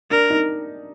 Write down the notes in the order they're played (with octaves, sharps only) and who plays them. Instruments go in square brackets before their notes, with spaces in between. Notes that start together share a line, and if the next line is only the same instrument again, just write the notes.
[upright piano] D4 [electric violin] A#4
[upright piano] D#4